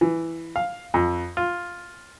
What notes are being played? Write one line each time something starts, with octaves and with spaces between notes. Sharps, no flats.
E3
F5
F2
F4